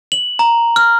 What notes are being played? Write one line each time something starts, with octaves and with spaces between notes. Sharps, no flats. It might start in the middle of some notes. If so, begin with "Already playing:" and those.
F#7
A#5
F6